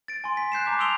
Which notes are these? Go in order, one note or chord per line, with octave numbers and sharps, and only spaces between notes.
A6 D7
G#5 C6
B6
F#6 G6 C7 E7
A5 A#5 D6 B6 C7
C6 D#6 E6 D7 F7 G7